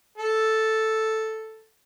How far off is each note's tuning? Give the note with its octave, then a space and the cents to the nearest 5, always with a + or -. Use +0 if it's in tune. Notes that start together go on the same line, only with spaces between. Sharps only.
A4 +0